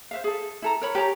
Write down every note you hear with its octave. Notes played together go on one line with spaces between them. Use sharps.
C5 E5 F5
G#4 A4
E4 A4 A#5
A#4 C#5 B5
G4 C#5 A5 A#5